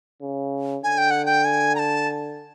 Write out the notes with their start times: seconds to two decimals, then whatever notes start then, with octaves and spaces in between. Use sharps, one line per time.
0.22 C#3
0.83 D3 G#5
0.98 G5
1.11 F#5
1.26 G5
1.45 G#5
1.75 A#5
1.79 A5